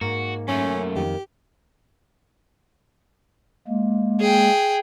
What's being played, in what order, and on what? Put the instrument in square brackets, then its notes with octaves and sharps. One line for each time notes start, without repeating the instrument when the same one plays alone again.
[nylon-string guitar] G#2 [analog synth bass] A#3 [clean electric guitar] F#4
[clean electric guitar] F#2 A3 [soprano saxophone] C#4
[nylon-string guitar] F2 D#3 [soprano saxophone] G4
[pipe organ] G#3 A#3
[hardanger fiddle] G#4 G5